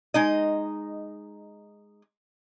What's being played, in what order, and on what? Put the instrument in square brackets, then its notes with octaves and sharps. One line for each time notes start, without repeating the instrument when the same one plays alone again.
[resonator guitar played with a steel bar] G#3 D#4 D#5